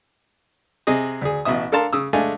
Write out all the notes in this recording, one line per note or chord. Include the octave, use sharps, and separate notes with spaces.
C3 G#4 D#5
D2 G#4
A1 B2 E5 D#6
D4 A4 A#4 F5 A5 C6
C#3 D#6 E6
G#3 A3 D4 F5 G#5